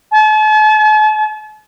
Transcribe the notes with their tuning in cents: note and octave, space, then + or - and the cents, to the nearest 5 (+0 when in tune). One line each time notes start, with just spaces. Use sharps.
A5 -45